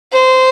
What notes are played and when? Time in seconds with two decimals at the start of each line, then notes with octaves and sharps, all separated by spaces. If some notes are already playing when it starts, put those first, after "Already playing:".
0.13 C5